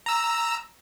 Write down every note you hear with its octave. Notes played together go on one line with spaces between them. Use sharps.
A#5 E6